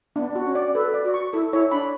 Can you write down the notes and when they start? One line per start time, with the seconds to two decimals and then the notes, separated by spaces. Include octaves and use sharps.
0.16 B3 D4
0.36 F#4
0.46 C#4
0.55 D5
0.74 A4 B4
0.94 D5
1.04 F#4
1.14 C#6
1.33 E4 A4
1.53 E4 C#5
1.71 D4 B5